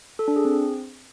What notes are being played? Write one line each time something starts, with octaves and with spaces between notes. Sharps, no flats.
A4
D4
G#4
C4